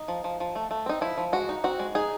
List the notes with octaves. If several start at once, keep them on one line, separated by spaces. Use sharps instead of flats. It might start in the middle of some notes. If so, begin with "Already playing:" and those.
Already playing: D#4
F3
F3
F3
A3
A3
C4 D#4
F3 E4
F3
G#3 F#4
D#4
C4 F#4
G#3
D#4 G#4